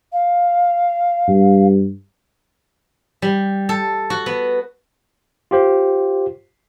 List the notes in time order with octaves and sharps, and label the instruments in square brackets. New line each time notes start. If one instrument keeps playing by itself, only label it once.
[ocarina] F5
[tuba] G2
[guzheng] G3
A4
F#4
B3
[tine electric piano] F4 G4 C5